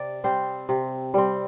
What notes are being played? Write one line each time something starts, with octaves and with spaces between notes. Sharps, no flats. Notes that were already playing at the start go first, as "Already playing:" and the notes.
Already playing: C3 D5
G3 C4 C5
C3
G3 C4